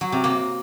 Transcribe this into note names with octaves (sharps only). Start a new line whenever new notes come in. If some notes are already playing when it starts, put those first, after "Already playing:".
F#3
C3
A#3